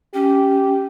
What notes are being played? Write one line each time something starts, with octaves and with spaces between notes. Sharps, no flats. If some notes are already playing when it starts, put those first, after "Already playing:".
C#4 G4